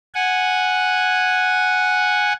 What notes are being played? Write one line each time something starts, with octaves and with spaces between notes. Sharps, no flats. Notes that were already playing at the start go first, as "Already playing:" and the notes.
F#5 G#5